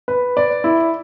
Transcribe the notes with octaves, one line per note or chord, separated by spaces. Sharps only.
B4
D5
E4